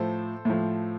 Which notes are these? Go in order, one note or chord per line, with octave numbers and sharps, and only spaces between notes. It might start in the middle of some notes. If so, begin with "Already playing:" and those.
Already playing: A2 F3 A4 C5
A2 F3